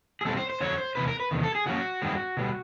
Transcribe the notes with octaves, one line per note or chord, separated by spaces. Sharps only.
G#4
B2 G3 C4 A4
C5
C5
F2 D3 F#3 C#5
C5
E2 C3 B4
A#4
B4
E2 C3 D#3
A4
G#4
D3 F3 A#3 C#4 F#4
G2 D#3 G#3 C4
B2 G3 B3